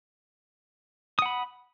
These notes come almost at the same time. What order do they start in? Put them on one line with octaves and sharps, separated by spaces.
D#6 F#5 B5